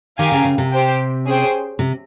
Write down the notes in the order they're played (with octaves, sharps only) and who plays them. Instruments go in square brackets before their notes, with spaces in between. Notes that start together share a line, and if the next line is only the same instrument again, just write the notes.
[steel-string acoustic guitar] D#3 [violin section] G4 A#4 F5 G#5
[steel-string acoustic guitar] C#3
C#3
C3
[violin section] G4 C5 G5
C#4 G#4 C5 G5
[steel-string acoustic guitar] C3